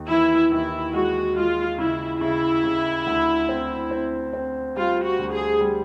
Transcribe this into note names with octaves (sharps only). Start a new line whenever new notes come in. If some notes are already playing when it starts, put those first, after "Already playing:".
Already playing: D#2
E3 E4
D#2 E4
G#3 F#4
G#3 F4
C#3 E4
C#3 E4
C#3
D2
C4
C4
C4
G3 F4
F#4
D2
G#4
G3